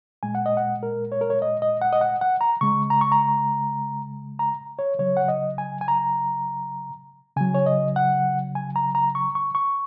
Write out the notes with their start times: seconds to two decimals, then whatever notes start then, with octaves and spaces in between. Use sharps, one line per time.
0.23 A#2 G#3 G#5
0.35 F#5
0.46 D#5
0.57 F#5
0.83 A#4
1.12 C#5
1.21 A#4
1.30 C#5
1.42 D#5
1.62 D#5
1.81 F#5
1.93 D#5
2.01 F#5
2.21 F#5
2.41 A#5
2.61 C#3 G#3 C#6
2.90 A#5
3.01 C#6
3.12 A#5
4.39 A#5
4.79 C#5
4.99 C#3 F#3 C#5
5.17 F#5
5.28 D#5
5.58 G#5
5.81 G#5
5.88 A#5
7.37 C#3 F#3 G#5
7.54 C#5
7.66 D#5
7.96 F#5
8.55 G#5
8.76 A#5
8.95 A#5
9.15 C#6
9.35 C#6
9.55 C#6